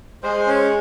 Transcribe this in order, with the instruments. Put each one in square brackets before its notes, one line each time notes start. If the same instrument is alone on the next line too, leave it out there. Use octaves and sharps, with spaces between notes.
[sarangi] G#3 [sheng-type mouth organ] C5
[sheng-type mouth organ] C#4